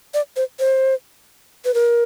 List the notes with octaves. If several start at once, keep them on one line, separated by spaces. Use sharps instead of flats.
D5
C5
C5
B4
A#4